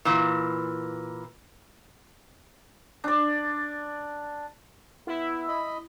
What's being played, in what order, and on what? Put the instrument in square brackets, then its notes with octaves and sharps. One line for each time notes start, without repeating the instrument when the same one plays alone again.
[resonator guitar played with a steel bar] A#2 E3
[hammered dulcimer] D4 D5
[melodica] B3 [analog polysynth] E4
[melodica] D#5 B5